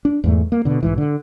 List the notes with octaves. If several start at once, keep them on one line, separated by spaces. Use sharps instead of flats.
D4
E2 G#2 A3
A#3
B2 D3
B1 G#2 E3
D3